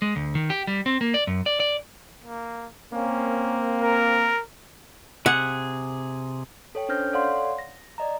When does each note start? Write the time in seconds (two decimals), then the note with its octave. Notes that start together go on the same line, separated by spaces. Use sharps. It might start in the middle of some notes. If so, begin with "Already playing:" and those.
0.02 G#3
0.16 D2
0.35 D#3
0.50 G4
0.67 G3
0.86 C4
1.01 A#3
1.14 D5
1.27 F#2
1.46 D5
1.60 D5
2.24 A#3
2.93 A#3 C4 C#4
3.81 A#4
5.26 C3 G#4 F#5
6.75 A4 C#5 G5
6.89 C#4 D4 C5 F6 G6 A#6
7.13 A4 C#5 D5 F5 F#5 C6
7.58 A#6
7.98 D5 D#5 A#5